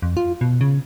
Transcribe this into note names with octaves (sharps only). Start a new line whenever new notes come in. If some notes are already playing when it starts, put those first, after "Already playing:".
F2
F4
B2
C#3